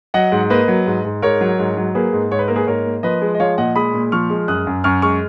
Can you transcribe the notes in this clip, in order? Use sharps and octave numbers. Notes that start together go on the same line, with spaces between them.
F#3 D#5 F#5
G#2
A#3 B4 D#5
F#3
G#2
G#2
G#2 A#4 C#5
F#3
G#2
F#3
A#3 G#4 B4
G#2
G#2 C#5
B4
A#3 A#4
G#4 B4
G#2 A#4 C#5
A#3
F3 B4 D#5
G#3
D#5
F3 C#5 F5
A#2 D#5 F#5
G#3 B5 D#6
A#2
F3 C#6 F6
G#3
F#2 D#6 F#6
F#2
F#2 C#6 F6
G#3 C#6 F6